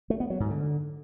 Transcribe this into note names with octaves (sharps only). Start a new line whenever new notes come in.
A3
B3
F#3
G#2
D3